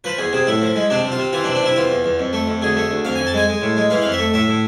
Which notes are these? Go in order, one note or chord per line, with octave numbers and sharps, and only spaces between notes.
F3 B4
E2 G#4
C3 G#4
A2 E4
F3
G#3
C3 D4
C3
F4
C3
E3 F4
D4
C3
D4
C3 E4
E2 F4
E2
E2
F2
A3
F2
D2 G#4
A3
D2
F2 F5
F2 G#5
A5
G#3 G#5
G#3
A2
G#3
E3 F5
F2 F5
E5
A3
A2 E5
A2